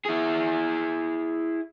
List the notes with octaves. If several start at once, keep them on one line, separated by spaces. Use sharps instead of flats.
E4 G#4